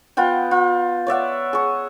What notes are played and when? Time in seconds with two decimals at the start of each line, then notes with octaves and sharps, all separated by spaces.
0.17 B3 F4 F#5 G5
0.51 F4
1.07 C#5 D5 E5 F#5
1.53 G#4 C#6